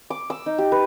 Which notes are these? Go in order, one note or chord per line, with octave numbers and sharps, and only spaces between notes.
D6
E6
D#4
G4
B4